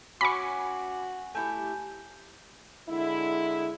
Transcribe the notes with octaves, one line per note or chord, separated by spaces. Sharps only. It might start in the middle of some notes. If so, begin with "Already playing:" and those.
C#4 F#4 G#5 B5 C#6 D6
A3 E4 G4 G#5 A5 G6
D3 G#3 E4